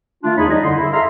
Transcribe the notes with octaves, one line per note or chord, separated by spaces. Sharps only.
D#3 A3 D4 F4
E2 D#4 G#4 C#5 B5
F#3 G3 D#4 G#4 D#5
F#2 D3 E4 C6
E4
G#4 A4 E5 F5 A#5 C6